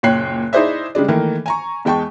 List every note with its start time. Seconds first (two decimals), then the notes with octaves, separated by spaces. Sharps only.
0.03 F#1 A#2 C#5 G5 F#6 C7
0.53 D#4 E4 G#4 C5 D5 E5
0.95 C#3 G3 G#3 D4
1.08 D#3 E3 A3 A#3
1.46 G#5 A#5 C#6
1.85 E2 G#3 G5 A5 C#6